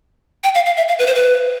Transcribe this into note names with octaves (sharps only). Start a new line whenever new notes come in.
G5
F5
F5
E5
F5
B4
C5
B4